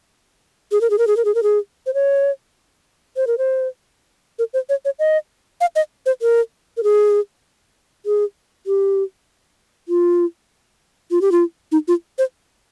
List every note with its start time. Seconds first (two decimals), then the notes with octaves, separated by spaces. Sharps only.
0.72 G#4
0.81 A#4
0.90 G#4
0.98 A#4
1.07 G#4
1.17 A#4
1.25 G#4
1.35 A#4
1.43 G#4
1.86 C5
1.94 C#5
3.16 C5
3.27 A#4
3.38 C5
4.39 A#4
4.53 C5
4.69 C#5
4.85 C#5
4.99 D#5
5.61 F5
5.76 D#5
6.06 C5
6.22 A#4
6.77 A#4
6.83 G#4
8.06 G#4
8.66 G4
9.88 F4
11.11 F4
11.21 G4
11.32 F4
11.72 D#4
11.88 F4
12.18 C5